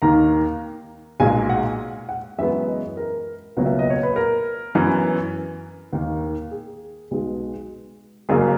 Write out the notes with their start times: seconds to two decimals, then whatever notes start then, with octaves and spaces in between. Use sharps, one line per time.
0.02 D#2 D#3 A#3 A#5
1.20 B1 A#2 G#3 G#5
1.49 F#5
2.09 F#5
2.39 F#2 E3 G#3 B3 E5
2.68 D#5
2.97 A#4
3.57 C#2 B2 F#3 A#3
3.66 E5
3.79 D#5
3.90 C#5
4.03 B4
4.16 A#4
4.75 F#2 E3 B3
5.93 D#2 D#3 A#3
6.51 G#4
7.11 B1 B2 G#3
8.29 F#1 F#2 C#3 F#3 A#3 G#4